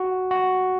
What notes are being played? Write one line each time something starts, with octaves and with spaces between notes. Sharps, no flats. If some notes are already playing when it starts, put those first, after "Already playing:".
Already playing: F#4
F#4